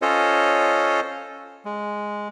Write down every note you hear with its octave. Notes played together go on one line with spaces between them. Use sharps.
C#4 F4 A4 C5 C#5 D#5
G#3